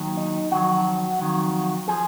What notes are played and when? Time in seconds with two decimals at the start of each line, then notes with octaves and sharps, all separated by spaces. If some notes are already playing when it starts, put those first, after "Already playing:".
Already playing: D#2 D#3 F#3
0.17 D#4
0.51 F2 D#3 F#3 F#4
1.19 F2 D#3 F#3
1.88 F3 G#4